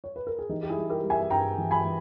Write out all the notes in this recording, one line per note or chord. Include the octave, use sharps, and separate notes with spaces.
C#5
B4
A#4
G#4
E3 D#4 G4
G4
E4 G#4
G3
G4 A#4
G3
E5 G#5
G2 G5 A#5
E3
G#5 B5
E3